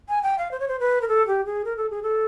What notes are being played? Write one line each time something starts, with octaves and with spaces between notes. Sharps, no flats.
G#5
G5
F5
C5
C#5
C5
B4
A#4
A4
G4
G#4
A#4
A4
G#4
A4